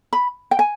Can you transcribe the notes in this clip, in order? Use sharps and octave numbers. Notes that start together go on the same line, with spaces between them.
B5
G5
G#5